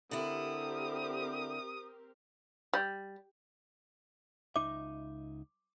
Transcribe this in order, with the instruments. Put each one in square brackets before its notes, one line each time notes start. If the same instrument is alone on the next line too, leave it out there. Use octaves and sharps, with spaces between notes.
[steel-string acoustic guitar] D3 E4 [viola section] C4 G4 A#4 [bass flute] A4 [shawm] D#6
[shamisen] G3
[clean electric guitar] C#2 D#4 E5 [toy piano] D6